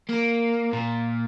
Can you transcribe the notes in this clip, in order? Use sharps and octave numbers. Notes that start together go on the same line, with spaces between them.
A#3
A#2